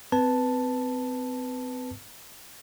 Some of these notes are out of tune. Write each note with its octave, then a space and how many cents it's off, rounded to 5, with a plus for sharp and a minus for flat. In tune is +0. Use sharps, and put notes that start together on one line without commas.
C4 -35 B4 +0 A5 +0